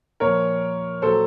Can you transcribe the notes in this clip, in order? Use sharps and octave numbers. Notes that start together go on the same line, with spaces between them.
A#2 F3 A#4 C#5
A#2 F#3 A4 C5